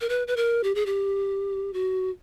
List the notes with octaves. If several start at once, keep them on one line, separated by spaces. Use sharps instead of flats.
A#4
B4
B4
A#4
G4
G#4
G4
F#4